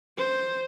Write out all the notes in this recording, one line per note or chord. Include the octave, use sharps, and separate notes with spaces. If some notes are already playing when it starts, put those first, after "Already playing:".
C5